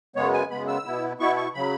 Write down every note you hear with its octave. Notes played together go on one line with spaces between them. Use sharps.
F#2 C#3 G#3 B3 C#5
G#5
F#2 C#3 G#3 B3 B5
E6
B2 B3 E4
B2 B3 E4 C#6
C#6
C#3 F#3 B5